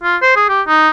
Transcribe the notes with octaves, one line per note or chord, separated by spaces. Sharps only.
F4
C5
G#4
G4
D#4